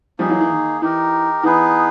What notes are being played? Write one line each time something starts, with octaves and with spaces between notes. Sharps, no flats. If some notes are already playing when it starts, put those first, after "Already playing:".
F3 G3 A#3 D#4 G#4
E3 F#3
E3
D#3
E3 D#4 G4 A#4
E3 B3 D#4 G#4 B4